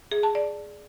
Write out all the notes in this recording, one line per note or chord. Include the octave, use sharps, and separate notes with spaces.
G#4
A5
D5